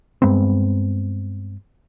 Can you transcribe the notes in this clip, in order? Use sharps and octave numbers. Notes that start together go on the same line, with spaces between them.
G2 G#3 B3 C4